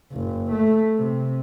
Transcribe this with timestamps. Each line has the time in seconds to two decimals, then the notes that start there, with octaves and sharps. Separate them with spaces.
0.13 F#1
0.52 A3
0.98 C3